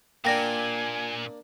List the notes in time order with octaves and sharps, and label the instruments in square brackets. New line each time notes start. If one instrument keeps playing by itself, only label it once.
[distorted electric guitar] A#2 [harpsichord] A#3 D4 [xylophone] G5 A#6 [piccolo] G#5